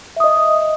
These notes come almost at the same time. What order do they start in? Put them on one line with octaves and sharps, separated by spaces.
E5 D#6 D#5